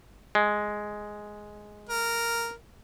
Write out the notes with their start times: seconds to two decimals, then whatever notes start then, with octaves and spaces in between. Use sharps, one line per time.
0.35 G#3
1.89 A#4